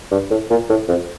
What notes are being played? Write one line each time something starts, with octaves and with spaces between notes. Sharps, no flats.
G2
A2
A#2
A2
F2